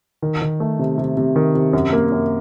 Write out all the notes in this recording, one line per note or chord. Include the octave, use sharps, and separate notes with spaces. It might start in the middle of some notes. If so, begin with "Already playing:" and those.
D#3
D#3
A3
C3
C3
C3
D#3
C3
F#2
A#3
F#2